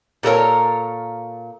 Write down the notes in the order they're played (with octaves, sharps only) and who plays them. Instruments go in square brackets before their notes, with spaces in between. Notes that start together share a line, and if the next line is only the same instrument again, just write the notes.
[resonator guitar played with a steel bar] A#2 A4 A#4 C#5